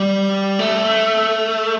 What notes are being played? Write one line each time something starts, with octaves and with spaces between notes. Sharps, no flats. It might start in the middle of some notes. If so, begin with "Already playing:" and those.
Already playing: G3
A3